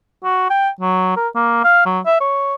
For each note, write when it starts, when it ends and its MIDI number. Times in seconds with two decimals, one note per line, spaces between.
0.24 0.48 66
0.50 0.69 79
0.80 1.14 54
1.17 1.28 70
1.35 1.62 58
1.64 1.84 77
1.86 2.00 54
2.06 2.19 76
2.21 2.55 73